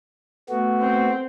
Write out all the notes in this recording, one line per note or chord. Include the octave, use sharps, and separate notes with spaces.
A3 B3 F#4
C4